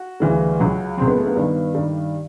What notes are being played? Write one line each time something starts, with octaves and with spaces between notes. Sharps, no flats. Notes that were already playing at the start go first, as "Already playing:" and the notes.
Already playing: F#4
D2 C#3 E3 G3
C#2 C#3 F#3
C#2 C#3 F#3 C4
B3
A3
B3
G2 D#3 G3
G2 D#3 G3